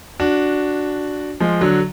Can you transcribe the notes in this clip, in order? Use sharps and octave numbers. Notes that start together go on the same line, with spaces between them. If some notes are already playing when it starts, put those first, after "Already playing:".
D4 F#4
F3 G#3
D3 F#3